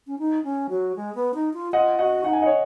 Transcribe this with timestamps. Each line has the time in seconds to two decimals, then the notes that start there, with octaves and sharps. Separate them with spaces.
0.07 C#4
0.19 D#4
0.44 C#4
0.70 F#3
0.96 G#3
1.15 B3
1.34 D#4
1.54 F4
1.73 F4 D#5 F#5
1.99 F#4 D#5 F#5
2.24 D#4 F#5
2.33 G#5
2.42 D#5 F#5
2.46 C#5